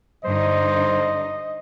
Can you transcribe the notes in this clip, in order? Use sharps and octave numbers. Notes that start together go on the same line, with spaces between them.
G2 D3 D#4 C5 D#5